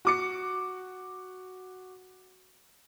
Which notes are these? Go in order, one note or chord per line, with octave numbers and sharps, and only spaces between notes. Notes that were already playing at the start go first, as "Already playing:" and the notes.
F#4 D6 C#7